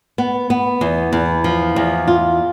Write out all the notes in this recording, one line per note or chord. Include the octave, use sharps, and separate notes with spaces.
B3
B3
E2
E2
F3
E2
F4